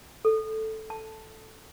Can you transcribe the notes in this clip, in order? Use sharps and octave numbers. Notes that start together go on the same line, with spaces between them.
A4
A5